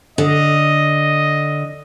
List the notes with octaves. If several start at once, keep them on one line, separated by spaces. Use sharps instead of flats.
D3 D#5